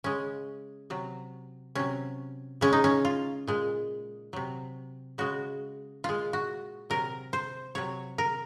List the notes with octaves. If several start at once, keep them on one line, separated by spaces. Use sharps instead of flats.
C#3 G#3 C#4
C3 F#3
C3 F#3 C#4
C#3 G#3 C#4
D#4
C#4
F4
A#2 G#3
C3 F#3
C#3 G#3 F#4
A#2 G#3 F4
F#4
C3 F#3 A#4
C5
C3 F#3 C#5
A#4